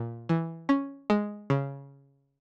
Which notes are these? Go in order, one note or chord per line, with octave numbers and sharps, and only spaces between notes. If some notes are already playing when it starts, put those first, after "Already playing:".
Already playing: A#2
E3
C#4
G#3
C#3